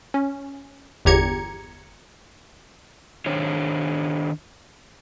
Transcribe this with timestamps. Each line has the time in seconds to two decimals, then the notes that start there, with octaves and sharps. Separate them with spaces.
0.14 C#4
1.05 G1 E2 G4 A#5 G#6 C#7
3.26 D#3 D4 C5 C#5